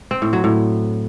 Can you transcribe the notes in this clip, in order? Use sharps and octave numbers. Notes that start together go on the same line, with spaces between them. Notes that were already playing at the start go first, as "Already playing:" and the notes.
C4
A2
F#3
A2